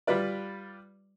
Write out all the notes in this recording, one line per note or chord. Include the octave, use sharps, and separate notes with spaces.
G3 F4 B4 D5